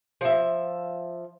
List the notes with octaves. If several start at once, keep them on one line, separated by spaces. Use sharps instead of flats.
F3 E5